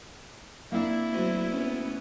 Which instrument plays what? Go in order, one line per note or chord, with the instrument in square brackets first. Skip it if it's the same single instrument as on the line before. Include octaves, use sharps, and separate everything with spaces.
[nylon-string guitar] A#3 C4 D4 [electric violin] E4
[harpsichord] D2 [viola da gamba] F#3
[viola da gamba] B3 C#4